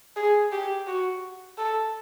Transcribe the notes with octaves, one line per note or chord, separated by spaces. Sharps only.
G#4
G4
F#4
A4